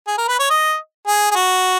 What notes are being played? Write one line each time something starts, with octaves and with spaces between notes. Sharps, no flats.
G#4
A#4
B4
C#5
D#5
G#4
G#4
F#4